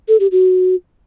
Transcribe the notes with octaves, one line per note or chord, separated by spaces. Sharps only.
A4
G4
F#4